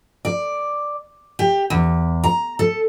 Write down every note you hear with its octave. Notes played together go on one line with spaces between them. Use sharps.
D5
G4
E2
A#5
A4